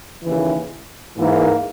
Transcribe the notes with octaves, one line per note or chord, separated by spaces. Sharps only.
D#2 C#3 E3
G#2 E3 A#3